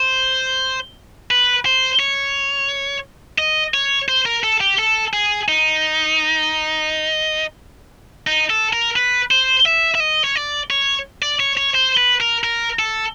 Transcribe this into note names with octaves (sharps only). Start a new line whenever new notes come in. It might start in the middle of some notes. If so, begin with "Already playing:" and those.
Already playing: C5
B4
C5
C#5
D#5
C#5
C5
A#4
A4
G4
A4
G#4
D#4
D#4
A4
A#4
B4
C5
E5
E5
D#5
C#5
D5
C#5
D5
C#5
C#5
C5
B4
A#4
A#4
A4